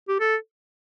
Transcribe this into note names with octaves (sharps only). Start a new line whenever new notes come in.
G4
A4